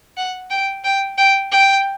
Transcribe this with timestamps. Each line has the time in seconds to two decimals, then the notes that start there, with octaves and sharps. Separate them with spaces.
0.17 F#5
0.50 G5
0.84 G5
1.18 G5
1.52 G5